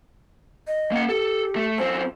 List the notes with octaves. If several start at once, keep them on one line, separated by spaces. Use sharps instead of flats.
D#5
A#3 F#5
G4 A4
A3
F#2 C4 C5